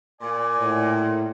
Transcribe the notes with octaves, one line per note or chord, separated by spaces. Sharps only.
A#2 D5 G#5
A2